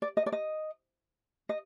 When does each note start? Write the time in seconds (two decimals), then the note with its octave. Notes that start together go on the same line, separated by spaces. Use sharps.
0.02 D5
0.17 D#5
0.26 D5
0.32 D#5
1.49 D#5